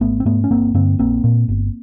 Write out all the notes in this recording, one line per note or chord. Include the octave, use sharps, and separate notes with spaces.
G#1 A3 B3
C4
G#2 A3 B3
C#4
G1 A#3 C4
G2 D3 A#3 C4
A#1 A#3 C4
A#2
G1